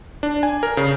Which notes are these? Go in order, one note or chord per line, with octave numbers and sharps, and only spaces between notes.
D4
G#5
A#4
C#3